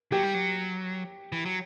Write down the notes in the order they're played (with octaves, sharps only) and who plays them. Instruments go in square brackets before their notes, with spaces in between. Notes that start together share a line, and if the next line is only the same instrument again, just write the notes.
[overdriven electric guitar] F#3 [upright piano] G4
[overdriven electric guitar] G3
F#3
E3
F#3